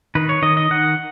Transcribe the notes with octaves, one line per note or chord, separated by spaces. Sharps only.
D#3 B4
C#5
D#3 D#5
D#5
D#3 F#5